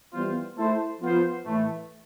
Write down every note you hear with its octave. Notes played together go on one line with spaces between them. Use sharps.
E3 G3 B3 F4 C5
A3 E4 A4 C5
F3 B3 F4 C5
A2 E3 A3